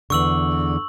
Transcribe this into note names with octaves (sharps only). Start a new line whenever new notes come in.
E2 D3 C#6 E6 F#7